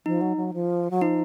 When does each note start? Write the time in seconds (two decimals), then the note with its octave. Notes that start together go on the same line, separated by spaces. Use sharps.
0.06 F3 D#4
0.21 F#3
0.37 F#3
0.54 F3
0.91 F#3
1.01 F3 D#4